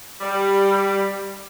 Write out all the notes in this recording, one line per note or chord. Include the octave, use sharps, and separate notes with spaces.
G3